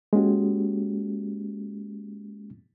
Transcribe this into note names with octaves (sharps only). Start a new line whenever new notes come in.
G#3 A#3 C#4 F#4 G4